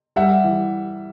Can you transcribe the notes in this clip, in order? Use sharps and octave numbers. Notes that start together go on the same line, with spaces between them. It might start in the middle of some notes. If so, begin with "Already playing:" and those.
G3 E5 F#5
E3